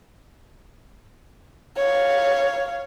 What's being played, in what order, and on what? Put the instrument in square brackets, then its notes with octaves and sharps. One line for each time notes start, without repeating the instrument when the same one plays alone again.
[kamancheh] C#5 F5